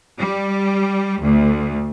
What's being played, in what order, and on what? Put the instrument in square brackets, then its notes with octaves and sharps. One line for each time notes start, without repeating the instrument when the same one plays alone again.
[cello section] G3
D2